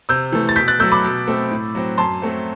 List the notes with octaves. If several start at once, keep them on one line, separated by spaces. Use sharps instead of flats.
C3 E6 G6
E3 A3
A6
B2 G6 B6
F#6 A6
F#3 A3 E6 G6
B5 D6
B2
A3 C4
A2
F#3 C4
F#2 A5 C6
F#3 A3 C4